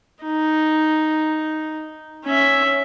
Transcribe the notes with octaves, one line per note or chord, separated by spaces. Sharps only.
D#4
C#4 E5